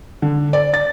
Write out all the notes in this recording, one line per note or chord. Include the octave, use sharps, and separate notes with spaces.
D3
D5
A6